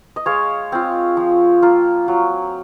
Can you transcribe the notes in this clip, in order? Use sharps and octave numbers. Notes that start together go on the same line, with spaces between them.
D#5
G#3 C#5 F5
C4 F4
F3
A#3 F4
F#3